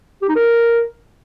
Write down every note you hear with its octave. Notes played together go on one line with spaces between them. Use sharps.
G4
D#4
A#4